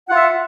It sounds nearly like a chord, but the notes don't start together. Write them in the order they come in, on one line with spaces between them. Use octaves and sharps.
F#5 F4 E5